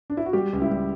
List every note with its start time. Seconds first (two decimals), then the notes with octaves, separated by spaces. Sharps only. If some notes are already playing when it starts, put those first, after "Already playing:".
0.10 D4
0.17 E4
0.26 F#4
0.33 G3 G4
0.53 C#2
0.62 E4
0.71 G3